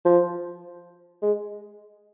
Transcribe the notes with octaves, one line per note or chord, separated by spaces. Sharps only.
F3
G#3